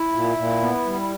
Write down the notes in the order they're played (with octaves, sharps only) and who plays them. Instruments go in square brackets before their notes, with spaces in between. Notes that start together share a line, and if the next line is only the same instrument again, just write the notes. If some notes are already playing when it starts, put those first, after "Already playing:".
Already playing: [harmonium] E4
A#2
A#2
B3
G3